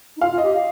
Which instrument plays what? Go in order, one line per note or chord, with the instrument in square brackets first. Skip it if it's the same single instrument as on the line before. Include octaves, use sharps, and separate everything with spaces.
[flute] D#4
[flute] F4 [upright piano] F5
[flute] F4
[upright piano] D#5
[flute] G4
F5